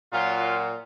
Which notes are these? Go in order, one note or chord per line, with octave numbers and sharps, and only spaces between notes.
A#2 F#3 F4